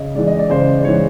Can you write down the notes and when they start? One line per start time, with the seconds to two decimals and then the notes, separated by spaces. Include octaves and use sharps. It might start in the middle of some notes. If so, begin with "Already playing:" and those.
Already playing: C#3 D#5
0.15 E3 G#3 D5
0.27 D#5
0.39 D5
0.50 C#3 C5
0.78 D5
0.84 E3 G#3 C#5